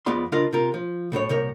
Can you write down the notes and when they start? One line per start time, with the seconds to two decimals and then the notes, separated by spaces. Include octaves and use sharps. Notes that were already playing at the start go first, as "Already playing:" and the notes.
0.06 F2 G#3 B3 F4 D5 C6
0.32 C#2 D4 F4 A#4 D#5 F5
0.53 C3 F4 A#4
0.74 F3
1.12 B1 A2 C5 C#5
1.29 C2 A#2 A#4 C#5